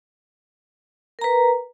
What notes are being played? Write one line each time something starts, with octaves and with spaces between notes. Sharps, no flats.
A#4 B4 A#5